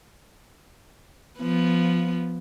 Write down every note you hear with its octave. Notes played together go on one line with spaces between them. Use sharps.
F3 B3